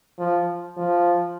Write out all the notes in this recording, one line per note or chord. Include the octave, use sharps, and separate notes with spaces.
F3
F3